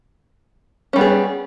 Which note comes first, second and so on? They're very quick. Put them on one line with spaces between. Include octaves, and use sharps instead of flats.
C#4 G3 B3 G#4